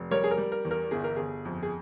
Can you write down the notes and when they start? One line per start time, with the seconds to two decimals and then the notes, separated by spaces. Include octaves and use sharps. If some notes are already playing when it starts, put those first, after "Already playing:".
Already playing: F1
0.11 G3 A#4 C#5
0.24 G#4
0.31 A#4
0.38 G3
0.52 A#4
0.65 E2
0.71 A#4
0.91 G1 G#4
1.04 A#4
1.16 G1 G#4
1.45 F2
1.63 G#4